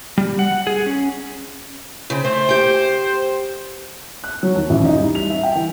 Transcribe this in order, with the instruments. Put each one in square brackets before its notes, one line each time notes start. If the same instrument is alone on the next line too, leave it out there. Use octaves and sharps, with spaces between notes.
[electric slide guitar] G3
F#5
G#4
C#4
[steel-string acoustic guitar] C#3 C4
[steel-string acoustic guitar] A3 [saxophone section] C5
[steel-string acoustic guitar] G4 G5
[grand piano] F#6
F#3
D#2
A1
D#4
G3
F7
E5
G5
E3